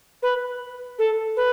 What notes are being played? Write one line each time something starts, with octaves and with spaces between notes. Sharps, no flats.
B4
A4
B4